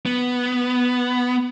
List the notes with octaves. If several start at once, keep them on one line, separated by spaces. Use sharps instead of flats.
B3